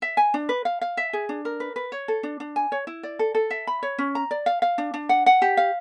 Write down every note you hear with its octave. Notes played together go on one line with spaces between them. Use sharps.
E5
G#5
D4
B4
F5
F5
E5
G#4
D4
A#4
B4
B4
C#5
A4
D4
D4
G#5
C#5
E4
D5
A4
A4
E5
B5
C#5
C#4
A#5
D5
F5
F5
D4
D4
F#5
F#5
G4
F5